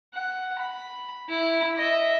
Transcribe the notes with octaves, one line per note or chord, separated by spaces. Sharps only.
F#5
B5
E4
D#5 E5